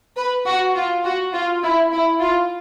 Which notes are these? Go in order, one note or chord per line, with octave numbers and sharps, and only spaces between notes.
B4
F#4
F4
F#4
F4
E4
E4
F4